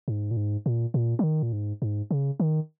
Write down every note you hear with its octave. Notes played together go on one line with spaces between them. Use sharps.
G#2
A#2
G#2
A#2
A#2
F#3
D#3
A#2
G#2
G#2
C#3
D#3